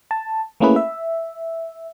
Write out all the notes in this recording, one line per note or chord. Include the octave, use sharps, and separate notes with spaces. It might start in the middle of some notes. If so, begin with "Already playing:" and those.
A5
A3 A#3 C#4 E4 G#4 B4
E5